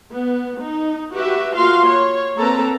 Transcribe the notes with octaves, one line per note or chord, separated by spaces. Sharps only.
B3
D#4
F#4 G4 B4 E5
A#3 F4 F#4 F5 C6
C#5
A#3 C4 A4 B4 A#5